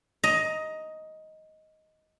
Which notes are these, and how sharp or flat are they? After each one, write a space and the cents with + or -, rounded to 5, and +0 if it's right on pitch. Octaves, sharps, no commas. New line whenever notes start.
D#5 +10 A#5 +0